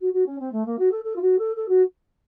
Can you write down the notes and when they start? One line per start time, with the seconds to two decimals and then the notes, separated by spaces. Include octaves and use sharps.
0.01 F#4
0.13 F#4
0.26 C#4
0.40 C4
0.52 A3
0.66 A#3
0.79 F#4
0.92 A4
1.04 A4
1.16 F4
1.22 F#4
1.39 A4
1.56 A4
1.69 F#4